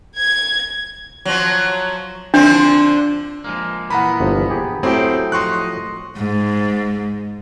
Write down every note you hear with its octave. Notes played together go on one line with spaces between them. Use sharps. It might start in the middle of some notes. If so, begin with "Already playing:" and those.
G#6
F3 F#3
D3 F3 C4 D4
F3 G#3 A#3
A#2 E3 B3 F#5 A#5 B5
G1 F3
G4 G#4
A2 F#3 C4 G4 G#4 G5
F3 D#5 C6 C#6 F#6
G#2